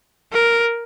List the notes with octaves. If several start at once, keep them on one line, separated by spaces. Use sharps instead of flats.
A#4